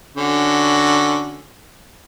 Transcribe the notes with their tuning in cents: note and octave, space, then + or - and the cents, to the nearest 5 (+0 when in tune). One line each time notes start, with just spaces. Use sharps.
D3 +0 C#4 +0 F#4 +0